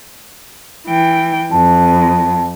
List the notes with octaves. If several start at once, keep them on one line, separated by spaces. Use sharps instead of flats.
E3 G5
F2 A5